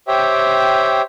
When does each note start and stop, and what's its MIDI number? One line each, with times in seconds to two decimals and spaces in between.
0.08 1.02 67
0.08 1.02 72
0.08 1.02 73
0.08 1.02 76
0.08 1.02 79